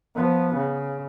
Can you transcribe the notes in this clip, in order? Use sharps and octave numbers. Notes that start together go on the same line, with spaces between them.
F3 B3
C#3